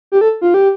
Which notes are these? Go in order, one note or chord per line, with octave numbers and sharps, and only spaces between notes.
G4
A4
F4
G4